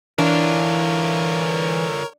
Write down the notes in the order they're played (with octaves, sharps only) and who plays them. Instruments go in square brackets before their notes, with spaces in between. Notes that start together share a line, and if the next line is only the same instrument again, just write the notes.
[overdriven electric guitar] D3 F4 [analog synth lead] E3 [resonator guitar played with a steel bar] D4 [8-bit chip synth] A#4 C#5